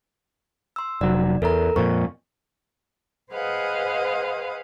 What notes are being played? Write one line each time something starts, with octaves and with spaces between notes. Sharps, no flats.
C6 E6
F1 F#3 D5
E2 A4 A#4 A#5
F2 A#2 C#6
G#4 B4 C5 D#5 F5 F#5